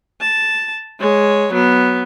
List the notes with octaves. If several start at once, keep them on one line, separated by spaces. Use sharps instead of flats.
A5
G#3 C#5
F#3 B3